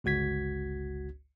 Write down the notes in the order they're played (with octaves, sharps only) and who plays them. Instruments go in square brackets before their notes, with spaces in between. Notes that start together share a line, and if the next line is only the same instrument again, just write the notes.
[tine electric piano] G1 C#2 F#4 G#6 B6